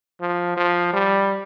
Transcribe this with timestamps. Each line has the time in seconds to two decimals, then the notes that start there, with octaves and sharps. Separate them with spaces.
0.21 F3
0.57 F3
0.94 G3